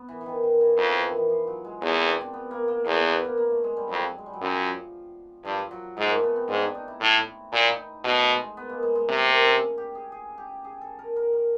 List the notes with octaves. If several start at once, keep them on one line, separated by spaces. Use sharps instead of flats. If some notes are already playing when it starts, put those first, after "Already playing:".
Already playing: B3
E3
E3
D#3
D#3
E3
F2 F3
E3
D#3
E3
F3
F#3
G#3
E2 B3
C4
D4
C4
B3
A#3
A#3
E2 A#3
B3
B3
A#3
A#3
A3
G#3
G3
F2 F#3
G#3
G3
F#3
F#2 F3
G2 F3
F#3
G#2 G#3
A#3
A3
B3
C4
G#2 D4
D4
D#4
E4
A2
A#2 E4
E4
D#4
B2 A3
A3
G#3
B3
A#3
G#3
G#3
C3 A3
A#3
C#4
G4
G#4
G#4
G4
G#4
A4
A#4
A#4
A#4